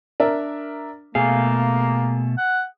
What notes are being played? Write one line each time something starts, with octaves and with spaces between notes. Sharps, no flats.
D4 A#4 E5
B2 A3 A#3 G#4 F5
F#5